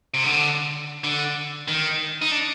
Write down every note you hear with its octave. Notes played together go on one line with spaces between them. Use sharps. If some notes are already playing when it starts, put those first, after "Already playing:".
C3
D3
D3
D#3
D#4
D4